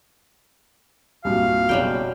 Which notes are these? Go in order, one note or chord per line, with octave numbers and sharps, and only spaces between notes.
C2 G2 A#2 F#4 F5
F#1 B2 F#3 G3 G5